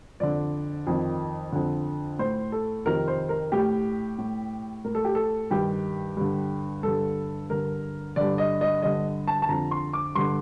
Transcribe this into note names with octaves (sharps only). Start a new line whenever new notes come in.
F2 D3 D5
F2 D#3
F2 D3
A2 C5
A4
F2 C3 D#3 A#4
C5
A#4
A2 G4
A2
A2 A#4
A4
G4
A4
G2 D#3 G4
G2 D3
G2 D3 A4
G2 D3 A#4
G2 D3 D5
D#5
D#5
G2 D3 D#5
A5
A5
F2 D3 A#5
C6
D6
G2 D3 C6